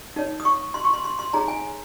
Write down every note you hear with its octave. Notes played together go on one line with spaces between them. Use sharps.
D#4 A#4 C#5
D#6
C#6
C6
C#6
C6
C6
C6
D#4 G#4 C#5 A#5
G#5